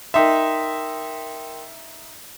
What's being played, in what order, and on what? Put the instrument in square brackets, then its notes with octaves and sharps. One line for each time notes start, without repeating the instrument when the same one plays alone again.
[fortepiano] D#4 E5 [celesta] A#4 G5 C6